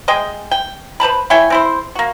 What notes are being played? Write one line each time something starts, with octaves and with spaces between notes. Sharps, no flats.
G#3 D#5 G5
G5
B4 C5 A5 B5
E4 C#5 G5 G#5
C4 E4 C5
A#3 F#4